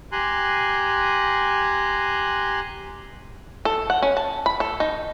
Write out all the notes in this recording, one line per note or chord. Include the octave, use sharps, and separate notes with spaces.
G4 G#5 A#5 C6 F#6
A4
F#5
C#4
A5
B5
A4
D#4